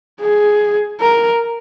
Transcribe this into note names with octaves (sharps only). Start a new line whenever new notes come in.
G#4
A#4